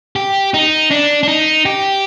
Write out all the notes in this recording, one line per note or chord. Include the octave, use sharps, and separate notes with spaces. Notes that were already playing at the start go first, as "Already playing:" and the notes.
G4
D#4
D4
D4
D#4
G4